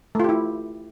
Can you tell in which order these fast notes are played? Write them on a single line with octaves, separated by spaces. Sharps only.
A3 F4 G4 E4